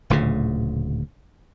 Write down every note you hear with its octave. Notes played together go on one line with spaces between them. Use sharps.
D1 D2 A#2 C#3